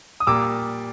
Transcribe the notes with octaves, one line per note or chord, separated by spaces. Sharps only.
D#6
A#2 G3 A#3 D6 E6